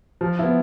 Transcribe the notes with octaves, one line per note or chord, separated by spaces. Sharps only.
F3
B3 E4